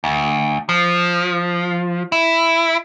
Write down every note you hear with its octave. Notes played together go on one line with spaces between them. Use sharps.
D2
F3
E4